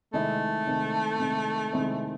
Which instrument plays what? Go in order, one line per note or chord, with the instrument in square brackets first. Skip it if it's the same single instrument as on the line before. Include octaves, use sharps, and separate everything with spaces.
[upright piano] C3 D#3 G#3 C4 E4 [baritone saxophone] A3
[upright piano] C3 D#3 G#3 C4 E4
C3 D#3 G#3 C4 E4
C3 D#3 G#3 C4 E4